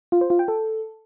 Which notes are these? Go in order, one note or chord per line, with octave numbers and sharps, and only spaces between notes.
F4
C5
F4
G5
A4